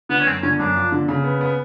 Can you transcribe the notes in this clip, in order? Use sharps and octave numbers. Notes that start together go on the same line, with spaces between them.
D3 B3
C#4
F#2 C4
D3 C#4
F#2 D4
F3
D3
C#3
B3
B3